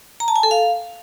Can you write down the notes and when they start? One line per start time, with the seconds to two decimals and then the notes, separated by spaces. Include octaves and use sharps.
0.20 A#5
0.28 A5
0.36 G#5
0.43 A4
0.51 F5